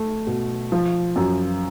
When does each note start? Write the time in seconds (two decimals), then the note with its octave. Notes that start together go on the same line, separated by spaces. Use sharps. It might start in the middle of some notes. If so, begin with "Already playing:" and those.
Already playing: A3
0.27 B2
0.72 F3
1.16 F#2